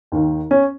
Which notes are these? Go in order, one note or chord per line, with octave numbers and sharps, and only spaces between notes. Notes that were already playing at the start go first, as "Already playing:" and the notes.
D#2 D#3
C#4